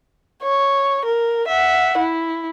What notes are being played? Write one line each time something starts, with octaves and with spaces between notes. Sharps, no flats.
C#5
A#4
E5 F#5
E4